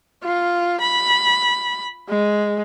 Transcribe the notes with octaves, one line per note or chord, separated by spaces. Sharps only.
F4
B5
G#3